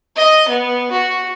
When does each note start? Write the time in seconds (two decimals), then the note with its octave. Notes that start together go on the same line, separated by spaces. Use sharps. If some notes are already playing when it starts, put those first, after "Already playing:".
0.16 D#5
0.48 B3
0.91 F#4